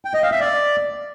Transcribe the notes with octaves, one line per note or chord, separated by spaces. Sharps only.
G5
D#5
F5
E5
D5